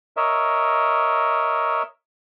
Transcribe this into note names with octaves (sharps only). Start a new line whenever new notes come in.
A#4 C#5 D#5 E5